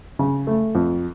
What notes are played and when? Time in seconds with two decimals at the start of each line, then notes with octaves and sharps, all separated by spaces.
0.19 C#3
0.47 A3
0.75 F2